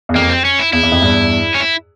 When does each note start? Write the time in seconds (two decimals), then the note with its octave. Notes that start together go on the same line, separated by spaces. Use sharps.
0.09 E2
0.15 F2 A#3
0.29 C4
0.45 C#4
0.59 E4
0.73 E2 E4
0.83 E2
0.92 F2
1.02 E2 G2
1.55 C#4
1.60 E4